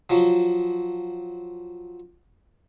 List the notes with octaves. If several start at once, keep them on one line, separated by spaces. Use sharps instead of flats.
F3 F#3